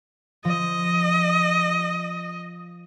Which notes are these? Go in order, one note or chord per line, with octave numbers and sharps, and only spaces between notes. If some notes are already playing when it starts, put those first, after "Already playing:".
F3 D#5